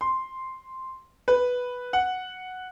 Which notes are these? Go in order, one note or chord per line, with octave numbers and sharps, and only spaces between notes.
C6
B4
F#5